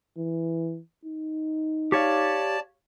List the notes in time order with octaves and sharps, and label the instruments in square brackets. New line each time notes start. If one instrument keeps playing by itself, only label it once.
[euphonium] E3
D#4
[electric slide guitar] G4 C#5 F5 [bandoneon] D5 A5